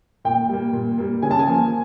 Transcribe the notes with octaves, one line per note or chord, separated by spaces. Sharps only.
A#2 G5
G3 A#3
A#2
G3 A#3
C#3 G#5
A5
G#5
F3 A#3